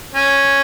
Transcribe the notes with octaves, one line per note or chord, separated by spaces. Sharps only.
C#4